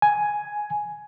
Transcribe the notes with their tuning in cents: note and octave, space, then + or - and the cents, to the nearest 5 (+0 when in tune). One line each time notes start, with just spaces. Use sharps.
G#5 +5